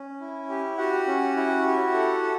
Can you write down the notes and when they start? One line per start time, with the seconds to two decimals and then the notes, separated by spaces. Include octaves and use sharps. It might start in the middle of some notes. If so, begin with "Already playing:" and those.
Already playing: C#4
0.21 E4
0.49 G4
0.78 F#4 G4 F#5
1.07 C#4
1.37 E4
1.66 G4
1.94 A4
2.23 A4